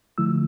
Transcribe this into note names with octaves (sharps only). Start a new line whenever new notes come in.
D3 F3 A3 E4 E6